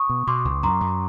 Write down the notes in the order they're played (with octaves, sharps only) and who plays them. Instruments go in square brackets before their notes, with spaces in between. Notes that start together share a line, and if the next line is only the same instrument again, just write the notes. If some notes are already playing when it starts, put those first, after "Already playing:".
Already playing: [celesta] C#6 D#6
[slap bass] B2
[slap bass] B2 [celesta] C6 D6
[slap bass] C#2
[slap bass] F#2 [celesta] A#5 C6
[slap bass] F#2